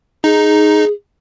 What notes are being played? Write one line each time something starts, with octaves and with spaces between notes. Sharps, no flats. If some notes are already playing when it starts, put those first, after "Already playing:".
D#4 G#4